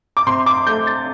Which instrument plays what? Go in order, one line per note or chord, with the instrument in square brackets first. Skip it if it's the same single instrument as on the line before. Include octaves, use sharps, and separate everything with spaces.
[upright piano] D6
C3 C6
D6
A3 G6
A6